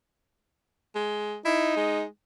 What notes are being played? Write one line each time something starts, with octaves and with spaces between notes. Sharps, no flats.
G#3
D#4 E4
G#3